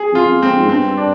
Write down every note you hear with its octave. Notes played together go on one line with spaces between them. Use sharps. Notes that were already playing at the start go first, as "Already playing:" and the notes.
Already playing: G#4
F2 F4
F2
C4
G#2
G2 C4
D4